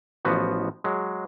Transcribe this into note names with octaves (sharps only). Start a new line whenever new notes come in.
A1 F3 B3 F#4
F#3 G#3